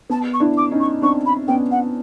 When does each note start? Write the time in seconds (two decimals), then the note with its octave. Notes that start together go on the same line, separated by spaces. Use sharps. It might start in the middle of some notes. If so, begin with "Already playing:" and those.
0.10 B3 A5
0.33 C#6
0.40 D4 E4
0.56 D6
0.71 C#4 D#4
0.80 C#6
1.02 C4 D4 C#6
1.25 B5
1.47 B3 C#4 G5
1.71 F#5